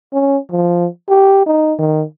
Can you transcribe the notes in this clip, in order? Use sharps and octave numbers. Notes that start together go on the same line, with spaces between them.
C#4
F3
G4
D#4
D#3